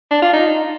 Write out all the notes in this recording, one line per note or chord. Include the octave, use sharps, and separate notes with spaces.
D4
F4
D#4